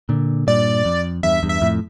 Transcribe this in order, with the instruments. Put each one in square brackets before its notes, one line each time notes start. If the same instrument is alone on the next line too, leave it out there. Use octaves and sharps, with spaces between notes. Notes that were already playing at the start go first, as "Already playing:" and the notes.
[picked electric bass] A#2 D3
[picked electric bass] G2 A#2 [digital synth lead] D5
[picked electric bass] F2
[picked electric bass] E2 G2 [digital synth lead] E5
[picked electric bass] E2 G2
[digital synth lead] E5
[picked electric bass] F2 A2